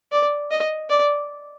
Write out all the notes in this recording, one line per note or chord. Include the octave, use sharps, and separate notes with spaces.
D5
D#5
D5